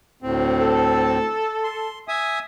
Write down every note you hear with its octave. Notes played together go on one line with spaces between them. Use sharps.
D2 A2 C4
A4
C6
E5 G#5 D#6